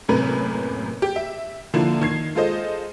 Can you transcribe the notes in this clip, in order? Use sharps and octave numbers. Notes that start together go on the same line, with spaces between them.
F#1 F#2 A2 C3 A#4 B4
G4
E5
D3 F3 A#3 E4
D#3 G#6 C7
G#3 F4 A4 C5 D#5